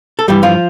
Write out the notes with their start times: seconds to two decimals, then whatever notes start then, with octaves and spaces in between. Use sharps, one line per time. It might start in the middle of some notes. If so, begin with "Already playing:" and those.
0.19 A4
0.28 G2 E3 G3 G4
0.43 F3 F4